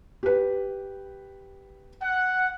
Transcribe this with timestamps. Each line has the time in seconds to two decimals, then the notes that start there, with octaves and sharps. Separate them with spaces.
0.23 G4 B4
2.02 F#5